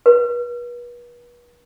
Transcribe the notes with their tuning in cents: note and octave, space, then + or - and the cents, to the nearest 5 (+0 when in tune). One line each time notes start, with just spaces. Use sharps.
B4 -40